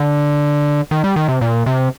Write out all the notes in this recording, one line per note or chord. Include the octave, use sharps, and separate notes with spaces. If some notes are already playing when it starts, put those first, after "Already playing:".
Already playing: D3
D#3
G3
D#3
C3
A#2
C3